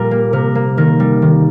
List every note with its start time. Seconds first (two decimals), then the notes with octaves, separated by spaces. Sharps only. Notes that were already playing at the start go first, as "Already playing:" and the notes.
Already playing: A#2 G3 A#4
0.11 A#3
0.33 C3 A#4
0.55 A#3
0.77 D#3 A#4
1.00 G3
1.22 D#3